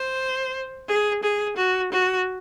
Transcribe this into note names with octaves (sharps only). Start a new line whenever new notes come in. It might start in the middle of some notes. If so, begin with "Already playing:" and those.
Already playing: C5
G#4
G#4
F#4
F#4